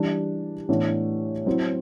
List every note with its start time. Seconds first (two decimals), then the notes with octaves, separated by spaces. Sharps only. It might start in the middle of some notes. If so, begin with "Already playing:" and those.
Already playing: E3 G3 D4
0.69 A2 E3 B3 D4
1.46 F#3 C4 E4